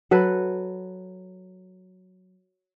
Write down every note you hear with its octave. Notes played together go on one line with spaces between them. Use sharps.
F#3 A4 B4